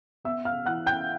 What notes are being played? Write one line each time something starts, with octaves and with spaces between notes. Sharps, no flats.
B3 E5 E6
F5 F6
E3 F#5 F#6
G5 G6